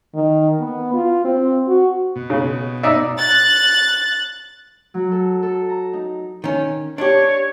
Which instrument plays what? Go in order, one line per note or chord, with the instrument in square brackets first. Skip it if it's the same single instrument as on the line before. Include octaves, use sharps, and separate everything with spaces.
[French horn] D#3
B3
F4
C4
F#4
[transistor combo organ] B2
[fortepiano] C#3
D#4 D5 E5
[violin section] F#6 A6
[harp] F#3
A4
A4
A#5
D#4
[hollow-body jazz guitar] D#3 C#4
[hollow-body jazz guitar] D4 G4 [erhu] C#5